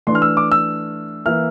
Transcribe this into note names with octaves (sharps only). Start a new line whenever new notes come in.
E3 A3 D4 C6
F6
E6
D6
E6
E3 A#3 E4 F6